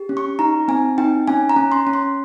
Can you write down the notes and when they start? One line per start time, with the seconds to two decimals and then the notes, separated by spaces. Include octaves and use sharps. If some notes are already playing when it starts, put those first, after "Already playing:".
Already playing: G4
0.09 C#4
0.17 C#6
0.39 D#4 A#5
0.68 C4 G#5
0.98 D#4 G5
1.28 C#4 G#5
1.49 A#5
1.56 C#4
1.72 C6
1.87 C#4
1.93 C6